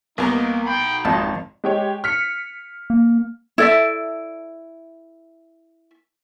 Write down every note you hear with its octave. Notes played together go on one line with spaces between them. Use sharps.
C2 A#3 B3 D#4 A#5
B1 G5 B5
G#1 F2 D#4 A5
G#3 G4 C#5
F6 B6 C#7
A#3
E4 A4 D5 E5